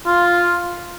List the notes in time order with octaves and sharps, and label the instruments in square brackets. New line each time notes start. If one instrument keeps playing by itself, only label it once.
[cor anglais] F4